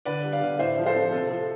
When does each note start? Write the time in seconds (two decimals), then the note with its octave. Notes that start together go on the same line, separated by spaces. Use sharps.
0.05 D3 B4 D5
0.24 G3
0.32 D5 F5
0.41 D3
0.59 A2 C5 E5
0.77 F3
0.86 A4 C5
0.95 C4
1.12 C3 A4
1.31 F3 A4